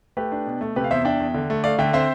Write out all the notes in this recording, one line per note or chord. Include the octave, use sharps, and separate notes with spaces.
A3 G4 B4
D4
B2
A3
C3 G4 B4
F5
E2 C5 E5
D4 E5 G5
E2
D3
A3
A3 D5 F5
D3 E5 G5
C4 C5 E5